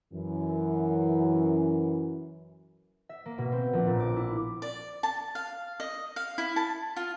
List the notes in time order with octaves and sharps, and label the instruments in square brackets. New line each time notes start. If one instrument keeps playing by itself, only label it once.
[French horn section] F#2 E3
[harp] E5
A#3
B2
C4
A#1
A#2
D6
E4
[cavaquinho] D5
A5
F5
D#5
F5
E4
A5
F4